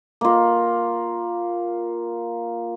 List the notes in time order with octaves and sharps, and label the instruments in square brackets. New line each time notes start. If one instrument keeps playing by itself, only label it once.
[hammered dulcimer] A#3 F4